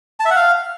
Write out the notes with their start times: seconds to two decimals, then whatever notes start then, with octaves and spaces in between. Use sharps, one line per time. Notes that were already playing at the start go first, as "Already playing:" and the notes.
0.20 A5
0.25 E5
0.31 F#5
0.36 F5